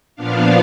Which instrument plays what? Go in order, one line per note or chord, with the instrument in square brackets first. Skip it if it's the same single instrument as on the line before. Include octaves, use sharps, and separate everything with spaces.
[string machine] A#2 F3 B3 D4 F5